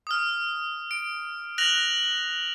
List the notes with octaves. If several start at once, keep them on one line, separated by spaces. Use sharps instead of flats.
D#6 F6
D7
F#6 A#6 F7 F#7